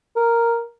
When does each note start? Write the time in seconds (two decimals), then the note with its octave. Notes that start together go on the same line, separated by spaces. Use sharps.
0.16 A#4